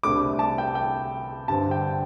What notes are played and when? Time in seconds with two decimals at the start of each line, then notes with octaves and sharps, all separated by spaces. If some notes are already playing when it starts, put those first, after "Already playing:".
0.03 C2 C3 A3 D4 D6
0.39 A5
0.58 G5
0.75 G5
1.48 G2 D3 C4 A5
1.71 G5